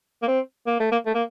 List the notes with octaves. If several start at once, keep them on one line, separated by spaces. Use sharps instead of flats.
A#3
C4
A#3
A3
A#3
A3
A#3